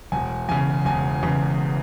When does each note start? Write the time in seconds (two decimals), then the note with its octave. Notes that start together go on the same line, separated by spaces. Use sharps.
0.12 E1 G#5
0.49 E2 C#3 G#5
0.85 E1 G#5
1.23 E2 C#3